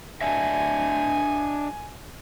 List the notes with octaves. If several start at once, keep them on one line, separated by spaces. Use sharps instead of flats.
D4 D#5 E5 G#5